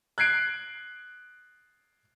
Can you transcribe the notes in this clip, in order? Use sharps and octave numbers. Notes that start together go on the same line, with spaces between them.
F#6 G#6 C7 D7